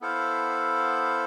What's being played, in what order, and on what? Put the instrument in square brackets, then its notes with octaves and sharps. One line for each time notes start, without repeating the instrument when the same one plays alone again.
[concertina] B3 E4 A4 C5 F5